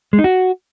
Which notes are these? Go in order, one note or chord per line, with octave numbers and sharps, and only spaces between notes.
G#3
D#4
F#4